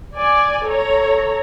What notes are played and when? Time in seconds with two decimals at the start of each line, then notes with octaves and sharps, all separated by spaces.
0.16 D5 G#5
0.65 A4 C#5 A#5